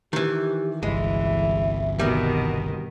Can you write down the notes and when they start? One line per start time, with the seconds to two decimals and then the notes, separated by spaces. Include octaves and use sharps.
0.13 D#3 E3 G4
0.83 G1 C2 E3 G#3 E5
1.99 B2 D#3 G3 B3